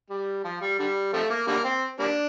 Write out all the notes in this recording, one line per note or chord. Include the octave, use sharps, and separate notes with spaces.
G3
F3
G3
D3 G3
C3 F3 A3
A#3
D3 G3 A#3
C4
G3 A#3 D4